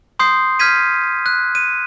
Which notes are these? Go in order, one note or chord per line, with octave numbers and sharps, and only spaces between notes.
C6 D#6 G6 C7
F6 G6 G#6 B6 D#7
F#6
D#7